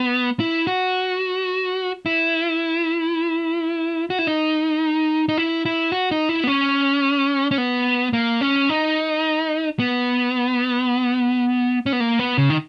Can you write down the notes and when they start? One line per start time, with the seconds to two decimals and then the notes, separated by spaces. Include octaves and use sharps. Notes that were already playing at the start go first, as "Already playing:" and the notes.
Already playing: B3
0.40 E4
0.67 F#4
2.06 E4
4.10 F#4
4.19 E4
4.27 D#4
5.29 D#4
5.38 E4
5.65 E4
5.92 F#4
6.11 D#4
6.29 E4
6.44 B3
6.48 C#4
7.51 C#4
7.58 B3
8.13 A#3
8.41 C#4
8.69 D#4
9.79 B3
11.86 C#4
11.93 B3
12.00 A#3
12.19 B3
12.38 C#3
12.50 D#3